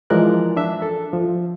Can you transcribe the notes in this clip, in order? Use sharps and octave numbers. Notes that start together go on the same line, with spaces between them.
E3 F3 G#3 A#4 D5 F#6
D4 E5
A4
F3